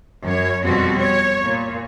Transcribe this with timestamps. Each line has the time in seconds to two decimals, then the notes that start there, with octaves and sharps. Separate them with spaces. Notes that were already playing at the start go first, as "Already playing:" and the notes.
0.23 F#2 C#5
0.65 F2 B2 G3 C4 F#4
0.98 C#5
1.44 A#2